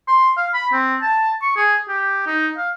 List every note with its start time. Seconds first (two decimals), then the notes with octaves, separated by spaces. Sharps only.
0.08 C6
0.37 F5
0.54 B5
0.72 C4
1.02 A5
1.42 C#6
1.56 G#4
1.89 G4
2.26 D#4
2.58 F5